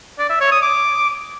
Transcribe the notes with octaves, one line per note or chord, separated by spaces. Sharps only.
D5
E5
C#5
D#6
D6